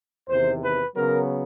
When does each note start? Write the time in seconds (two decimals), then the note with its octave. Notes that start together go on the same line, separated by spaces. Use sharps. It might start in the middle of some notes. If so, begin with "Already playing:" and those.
0.29 E2 C3 D#3 C5
0.62 B4
0.96 C#3 F#3 B3 A#4